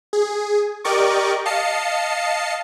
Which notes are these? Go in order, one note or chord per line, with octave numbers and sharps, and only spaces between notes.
G#4
G4 A#4 D5 D#5 C#6 D6
D#5 F5 A5 C7 C#7